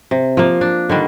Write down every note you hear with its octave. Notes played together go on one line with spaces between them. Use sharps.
C3
F3 A#3
D4
D3 D#3 G3